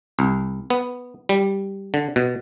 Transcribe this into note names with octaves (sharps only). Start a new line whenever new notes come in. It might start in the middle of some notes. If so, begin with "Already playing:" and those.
C2
B3
G3
D3
B2